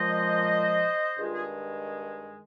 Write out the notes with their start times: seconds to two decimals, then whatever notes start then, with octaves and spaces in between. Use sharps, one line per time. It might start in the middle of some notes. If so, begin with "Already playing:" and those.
Already playing: A#2 F3 G#3 C5 D#5
1.17 G2 D#3 G#3 F4 G#4
1.32 G#4